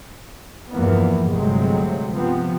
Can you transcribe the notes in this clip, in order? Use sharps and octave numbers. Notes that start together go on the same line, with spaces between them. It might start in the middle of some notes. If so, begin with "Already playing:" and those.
E2 G2 E3 F3 A#3 B3
G1 C3 F#3 G#3 A3 C4
C3 F3 B3 C4